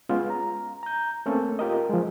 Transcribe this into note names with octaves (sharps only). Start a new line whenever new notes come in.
G#3 B3 C#4 F4
A#5
A#5 G6
A3 A#3 C4 C#4 A4
F4 G4 A#4 D#5
F3 G#3